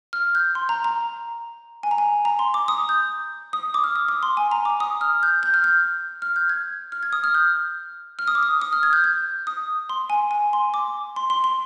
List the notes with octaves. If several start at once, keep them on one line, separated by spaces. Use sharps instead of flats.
F6
G6
C6
A#5
A#5
G#5
A#5
G#5
A#5
C6
D6
D#6
G6
D#6
D6
F6
D#6
D6
C6
G#5
A#5
D6
D#6
F6
G6
G6
F6
G6
F6
G6
G#6
F6
G#6
D#6
F6
G6
F6
D#6
D6
D#6
D#6
F6
G#6
G6
G6
D#6
C6
G#5
G#5
C6
D6
C6
C6
C6